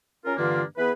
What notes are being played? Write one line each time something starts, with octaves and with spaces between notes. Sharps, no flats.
C#4 F4 A#4
G2 D3 E3 A#3 D4 F4
E3 B3 G#4 B4